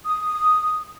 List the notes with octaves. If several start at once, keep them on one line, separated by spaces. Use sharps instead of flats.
D#6